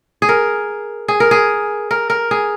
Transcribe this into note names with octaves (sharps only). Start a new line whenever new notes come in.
G#4
A#4
G#4
A#4
G#4
A#4
A#4
G#4